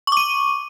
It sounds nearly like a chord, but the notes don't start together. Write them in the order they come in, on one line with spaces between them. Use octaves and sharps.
C#6 D6 D#7